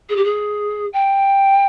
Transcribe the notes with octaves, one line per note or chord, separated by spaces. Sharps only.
G#4
G4
G#4
G5